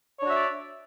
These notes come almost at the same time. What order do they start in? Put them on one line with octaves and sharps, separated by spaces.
C#5 D4 F#4 E5 D5